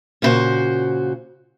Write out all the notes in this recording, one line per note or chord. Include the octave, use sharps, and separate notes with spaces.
A#2 C#3 E4 F#4 C5